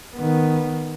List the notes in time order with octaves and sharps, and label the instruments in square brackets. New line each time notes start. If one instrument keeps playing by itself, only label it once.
[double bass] D#3 B3